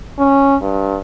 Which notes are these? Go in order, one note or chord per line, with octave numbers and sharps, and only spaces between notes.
C#4
G2